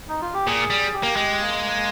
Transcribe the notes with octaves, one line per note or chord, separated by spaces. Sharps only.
D#4
F4
G4
A#2 G#4
G3
G4
A#3
G#3
A#3